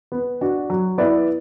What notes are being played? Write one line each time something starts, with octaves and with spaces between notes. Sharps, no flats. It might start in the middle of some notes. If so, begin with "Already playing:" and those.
B3
D4 F#4
F#3
B3 E4 B4 D5